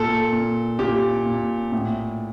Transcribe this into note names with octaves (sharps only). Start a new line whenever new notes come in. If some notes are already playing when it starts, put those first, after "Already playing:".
Already playing: A#2 A4
A#2
A#2 G4
A#2
A2